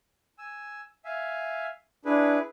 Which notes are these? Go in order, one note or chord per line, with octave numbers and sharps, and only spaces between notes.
G#5 E6
E5 F5 G#5
D4 E4 G#4 B4